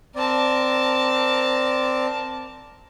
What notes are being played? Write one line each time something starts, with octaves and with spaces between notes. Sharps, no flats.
C4 A#4 D5 A5